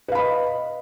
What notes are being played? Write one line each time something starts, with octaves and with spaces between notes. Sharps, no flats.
B4 D#5 F5 B5